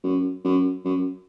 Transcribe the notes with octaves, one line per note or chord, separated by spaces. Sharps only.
F#2
F#2
F#2